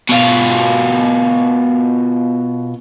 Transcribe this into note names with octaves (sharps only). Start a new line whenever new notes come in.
B2 F4